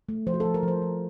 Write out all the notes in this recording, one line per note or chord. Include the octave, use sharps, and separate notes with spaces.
A3
F3 C5
F#4
F3 A4
A#4
F3 C5
F3